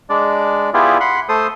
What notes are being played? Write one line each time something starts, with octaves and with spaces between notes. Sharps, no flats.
G#3 D4 D5
B3 E4 F4 G4 G#4 D5
F#5 B5 C6
A3 A4 C5 C6 D#6